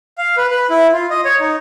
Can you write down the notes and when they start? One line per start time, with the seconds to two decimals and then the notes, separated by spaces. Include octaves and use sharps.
0.18 F5
0.37 B4
0.51 B4
0.70 E4
0.92 F4
1.10 D#5
1.25 C#5
1.40 D#4